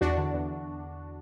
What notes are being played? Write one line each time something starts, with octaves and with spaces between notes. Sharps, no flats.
E2 D4 F#4
D3
E2